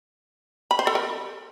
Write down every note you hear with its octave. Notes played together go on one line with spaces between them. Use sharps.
B5
C5
A4
A#4